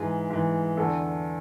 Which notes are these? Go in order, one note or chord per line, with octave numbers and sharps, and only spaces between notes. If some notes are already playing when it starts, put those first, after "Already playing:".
Already playing: G#2 E3 G#4
G#2 E3
E2 D3 A4